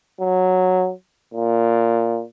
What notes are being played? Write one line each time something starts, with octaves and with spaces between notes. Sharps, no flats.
F#3
A#2